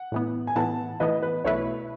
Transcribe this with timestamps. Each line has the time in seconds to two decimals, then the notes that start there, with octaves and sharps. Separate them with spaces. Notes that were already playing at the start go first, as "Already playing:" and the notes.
Already playing: F#5
0.12 A2 E3 B3
0.47 G#5
0.56 A2 E3 B3 F#5 A5
1.00 A2 E3 B3 B4 D#5
1.22 B4
1.44 B1 B2 A3 E4 B4 C#5